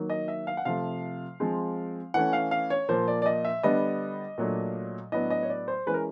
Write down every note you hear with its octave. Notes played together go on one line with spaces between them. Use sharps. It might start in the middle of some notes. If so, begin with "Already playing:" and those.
Already playing: D#3 F#3 A#3
D#5
E5
F5
F#5
C3 F3 A3 F5
F3 G#3 C4
E3 A3 C#4 F#5
F5
F5
C#5
A#2 F3 A#3 C5
D5
D5
D#5
E5
D3 G3 B3 D4 D#5
A#2 F#3 A3 D4
A2 F#3 B3 D4 D#5
D#5
C#5
D5
C5
E3 G#3 C#4 B4
A#4